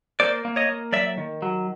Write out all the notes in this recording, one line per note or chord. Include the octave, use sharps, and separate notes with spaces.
A#3 C5 D5
A#3
C#5 D#5
A#3
F#3 D5 E5
D#3
F#3